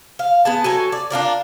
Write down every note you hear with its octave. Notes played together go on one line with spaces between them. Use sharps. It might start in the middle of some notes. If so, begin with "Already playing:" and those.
F5
B3 G#4 A5
F#3 A4 G#5
D5
D4 F4 A#4 D5